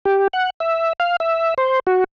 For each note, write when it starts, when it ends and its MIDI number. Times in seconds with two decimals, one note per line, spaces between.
0.05 0.28 67
0.33 0.50 78
0.60 0.93 76
1.00 1.16 77
1.20 1.54 76
1.58 1.80 72
1.87 2.04 66